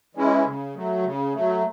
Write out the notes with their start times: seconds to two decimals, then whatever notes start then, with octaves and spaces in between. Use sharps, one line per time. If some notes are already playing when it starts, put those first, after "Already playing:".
0.15 E3 G#3 C#4 E4
0.45 C#3
0.75 F#3 A3
1.04 C#3
1.34 F#3 A3